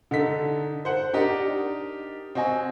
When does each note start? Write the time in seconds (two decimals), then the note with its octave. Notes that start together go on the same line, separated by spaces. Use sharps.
0.11 D3 D#4 A4 B6
0.85 C5 F#5
1.13 D4 D#4 G4 A#4 D#5
2.35 C4 F#4 D#5 G#5